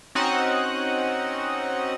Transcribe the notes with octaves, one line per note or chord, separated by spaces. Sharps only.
C4 C#4 D#4 F#4 D#5 F#5